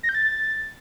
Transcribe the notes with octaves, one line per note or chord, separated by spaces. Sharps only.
A#6
G6
A6